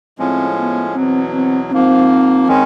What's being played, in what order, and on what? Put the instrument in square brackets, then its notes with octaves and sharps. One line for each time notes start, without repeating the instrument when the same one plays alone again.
[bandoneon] A2 F3 G#3 C#4 [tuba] C4
[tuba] B3
[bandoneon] E2 B2 F#3 [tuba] C4
[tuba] C4
[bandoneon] G#2 F3 A#3 [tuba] C4
[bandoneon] D#3 G#3 C#4